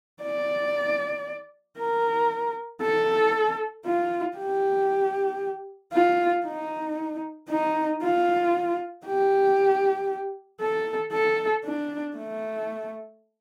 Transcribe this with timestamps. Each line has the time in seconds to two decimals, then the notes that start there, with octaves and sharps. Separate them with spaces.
0.22 D5
1.78 A#4
2.81 A4
3.86 F4
4.38 G4
5.93 F4
6.46 D#4
7.49 D#4
8.02 F4
9.06 G4
10.61 A4
11.13 A4
11.65 D4
12.16 A3